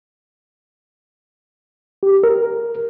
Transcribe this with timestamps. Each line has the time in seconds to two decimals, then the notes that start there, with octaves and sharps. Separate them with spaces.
2.03 G4
2.23 A#4